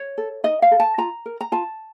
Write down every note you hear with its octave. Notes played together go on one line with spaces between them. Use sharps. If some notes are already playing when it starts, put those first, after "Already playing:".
Already playing: C#5
A4
D#4 D#5
F5
A4
A5
F4 A#5
A#4
A#5
F4 A5